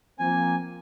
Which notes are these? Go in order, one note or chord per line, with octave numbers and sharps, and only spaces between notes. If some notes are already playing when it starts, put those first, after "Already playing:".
F3 A#3 C4 G#5